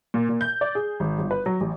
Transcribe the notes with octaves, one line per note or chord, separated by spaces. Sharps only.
A#2
A#2
G6
D5
G#4
G#1
G1
B4
F#3
A1